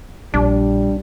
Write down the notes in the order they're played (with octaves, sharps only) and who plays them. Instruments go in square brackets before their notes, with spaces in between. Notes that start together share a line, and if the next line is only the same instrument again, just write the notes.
[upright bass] A#1 [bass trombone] G3 [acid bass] D4